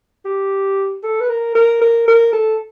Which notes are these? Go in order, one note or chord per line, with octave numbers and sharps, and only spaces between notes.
G4
A4
B4
A#4
A#4
A#4
A#4
A4